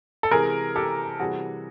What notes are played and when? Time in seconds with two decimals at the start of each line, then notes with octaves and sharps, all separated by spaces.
0.23 A4
0.31 C3 E3 G#3 G#4 A#4
0.76 G4 A4
1.20 C3 E3 G3 F#4 G#4